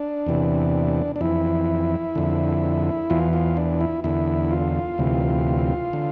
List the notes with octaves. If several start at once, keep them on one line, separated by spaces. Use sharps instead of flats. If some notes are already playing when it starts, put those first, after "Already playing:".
Already playing: D4
E2 C3 E3
D4
F2 E3 E4
F2 D3
E2 E3 F4
F4
D4
E4
E2 D3 E4
F4
D2 C3 E3
D3